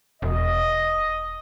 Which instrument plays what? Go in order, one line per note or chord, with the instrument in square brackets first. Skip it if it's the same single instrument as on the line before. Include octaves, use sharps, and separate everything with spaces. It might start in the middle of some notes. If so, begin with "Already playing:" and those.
[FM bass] E1 [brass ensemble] D#5